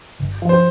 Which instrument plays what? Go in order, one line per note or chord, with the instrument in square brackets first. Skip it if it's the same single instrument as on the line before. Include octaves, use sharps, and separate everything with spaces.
[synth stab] G1
F3
[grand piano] C5